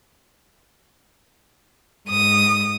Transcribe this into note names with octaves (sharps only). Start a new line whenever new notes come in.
G#2 D#6